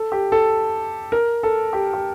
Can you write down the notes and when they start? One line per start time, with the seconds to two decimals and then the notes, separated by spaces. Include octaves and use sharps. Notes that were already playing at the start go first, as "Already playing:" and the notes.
Already playing: A4
0.12 G4
0.32 A4
1.12 A#4
1.43 A4
1.73 G4
1.93 G4